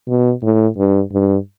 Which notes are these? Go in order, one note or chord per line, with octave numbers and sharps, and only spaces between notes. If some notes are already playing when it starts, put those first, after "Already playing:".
B2
A2
G2
G2